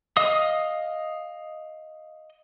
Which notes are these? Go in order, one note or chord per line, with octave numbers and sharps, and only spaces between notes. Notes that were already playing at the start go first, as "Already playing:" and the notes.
D#5 F5 D#6